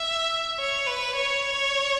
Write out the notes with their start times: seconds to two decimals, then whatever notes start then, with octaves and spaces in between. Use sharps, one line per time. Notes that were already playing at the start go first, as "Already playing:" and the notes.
Already playing: E5
0.59 C#5
0.87 B4
1.15 C#5